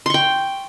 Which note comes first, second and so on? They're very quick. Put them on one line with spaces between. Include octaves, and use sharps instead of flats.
C6 C#6 G5